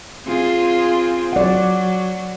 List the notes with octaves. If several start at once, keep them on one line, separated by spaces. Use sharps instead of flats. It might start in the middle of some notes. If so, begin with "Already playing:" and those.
C4 F4 G#4
F#3 D5 F#5